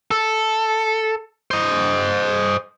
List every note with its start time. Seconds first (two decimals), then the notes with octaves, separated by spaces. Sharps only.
0.11 A4
1.51 C5 D#5